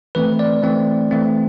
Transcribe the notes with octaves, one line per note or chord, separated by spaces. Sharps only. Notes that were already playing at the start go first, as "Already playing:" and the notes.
E3 A3 C4 B4
D5
E3 A3 C4
E3 A3 C4